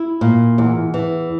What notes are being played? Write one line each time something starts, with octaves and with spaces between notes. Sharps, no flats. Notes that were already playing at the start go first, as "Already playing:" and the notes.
Already playing: E4
A#2
E2
E3